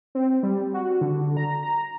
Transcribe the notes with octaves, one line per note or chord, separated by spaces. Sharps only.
C4
G3
F#4
D3
A#5
A#5